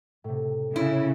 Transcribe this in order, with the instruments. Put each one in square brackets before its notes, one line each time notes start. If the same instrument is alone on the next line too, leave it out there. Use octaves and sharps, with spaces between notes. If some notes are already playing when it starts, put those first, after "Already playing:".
[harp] A2 C3
[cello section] C#3 [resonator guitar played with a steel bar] E4